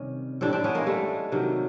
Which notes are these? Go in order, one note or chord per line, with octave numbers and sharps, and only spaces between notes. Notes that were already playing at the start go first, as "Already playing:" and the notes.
Already playing: C3 D#3 G3 C#4
A2 E3 G3 C4 D4
C4 D4
B3 C#4
G#3 A#3
G3 A3
C3 D#3 F#3